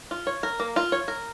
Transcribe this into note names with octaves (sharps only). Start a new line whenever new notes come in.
F4
C#5
A#4
A#3
F4
C#5
A#4